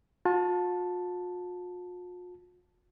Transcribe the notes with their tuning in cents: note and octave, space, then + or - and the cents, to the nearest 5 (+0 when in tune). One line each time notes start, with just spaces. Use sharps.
F4 +45 A5 +0